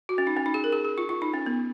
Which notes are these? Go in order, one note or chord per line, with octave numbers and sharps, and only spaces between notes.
F#4
C#4
D#4
C#4
D#4
G#4
A#4
G#4
G#4
F4
F4
D#4
C#4
B3